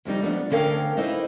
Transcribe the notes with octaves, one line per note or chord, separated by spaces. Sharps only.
F2 C#3 G3 D#4
F2 F3 A3 B3 D4
D2 D3 C#4 A#4 F5 G5
D#4 E4 B4 C5 D#5